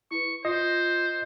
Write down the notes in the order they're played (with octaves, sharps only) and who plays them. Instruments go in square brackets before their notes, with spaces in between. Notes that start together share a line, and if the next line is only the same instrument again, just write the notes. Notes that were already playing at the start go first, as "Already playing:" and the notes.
[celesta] E4 B4 [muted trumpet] C#6
[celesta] F4 A#6 [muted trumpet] C5 [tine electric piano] D#5